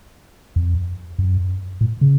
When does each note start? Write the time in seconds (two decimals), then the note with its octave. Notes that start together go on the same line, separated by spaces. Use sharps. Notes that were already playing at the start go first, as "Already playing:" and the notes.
0.56 F2
1.19 F#2
1.81 A2
2.01 C#3